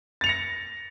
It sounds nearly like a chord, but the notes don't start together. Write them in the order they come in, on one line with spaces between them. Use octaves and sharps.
A6 F7 C#7 A#6